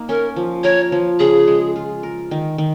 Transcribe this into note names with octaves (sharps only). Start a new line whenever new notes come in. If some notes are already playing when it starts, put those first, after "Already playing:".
Already playing: A#3 D#4
C#4 A#4
F3
A#4 C#5
F3
C#3 G#4
G#3
F4
A#4
D#3
D#3